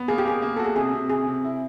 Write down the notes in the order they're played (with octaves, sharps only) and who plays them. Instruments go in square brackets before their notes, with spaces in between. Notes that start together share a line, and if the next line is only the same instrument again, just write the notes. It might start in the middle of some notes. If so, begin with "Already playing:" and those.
Already playing: [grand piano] B3
[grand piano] A#3 [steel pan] G#4
[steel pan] G4
[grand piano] A#3 [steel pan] G#4
[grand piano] A#3
[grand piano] F#4 [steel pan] A4
[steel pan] G#4
[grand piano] C3 [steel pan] G#4
[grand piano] C3
[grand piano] C3 [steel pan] G#4
[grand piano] C3
E4